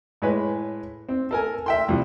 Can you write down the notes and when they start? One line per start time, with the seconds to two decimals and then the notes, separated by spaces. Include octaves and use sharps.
0.22 A2 G#3 B4 C#5
1.09 C4
1.31 A4 A#4 G#5
1.66 E5 G5 C6
1.88 C2 F3 E4